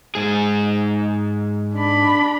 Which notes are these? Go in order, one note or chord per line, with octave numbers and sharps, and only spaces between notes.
G#2 G#4
D4 B5